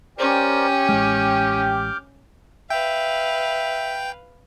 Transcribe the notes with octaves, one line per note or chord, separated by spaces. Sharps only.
C#4 G4 A#4 C5 D5 G5
A1 G#3 D6 F6 G6
B4 E5 F5 G5